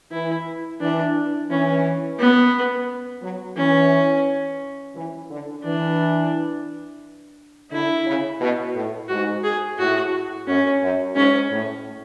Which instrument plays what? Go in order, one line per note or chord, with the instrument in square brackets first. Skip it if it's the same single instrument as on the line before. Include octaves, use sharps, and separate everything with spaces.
[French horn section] E3 [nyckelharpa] E4
[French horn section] E3 [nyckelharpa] D4
[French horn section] E3 [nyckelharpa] C#4
[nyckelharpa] B3
[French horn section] F#3
[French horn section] E3 [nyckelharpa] C#4
[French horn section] E3
D3
[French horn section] E3 [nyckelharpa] D4
[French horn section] D3 [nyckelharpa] E4
[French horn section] C#3
B2
A2
[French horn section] G#2 [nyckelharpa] F#4
[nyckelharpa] G#4
[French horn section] A2 [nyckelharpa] F#4
[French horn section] F#2 [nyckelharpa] C#4
[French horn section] F#2
[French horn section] G#2 [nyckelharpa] C#4
[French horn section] A2